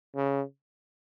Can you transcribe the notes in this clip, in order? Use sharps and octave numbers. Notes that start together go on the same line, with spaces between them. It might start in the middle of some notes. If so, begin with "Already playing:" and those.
C#3